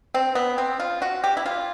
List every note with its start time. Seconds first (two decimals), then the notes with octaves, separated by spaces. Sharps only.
0.14 C4
0.35 B3
0.58 C4
0.80 F4
1.02 F#4
1.24 G4
1.37 E4
1.46 F4